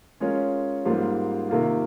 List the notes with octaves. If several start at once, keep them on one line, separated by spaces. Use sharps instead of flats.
G#3 C#4 F4 A#4 C#5
G#2 G3 A#3 F4 C5
C3 D#3 A#3 F4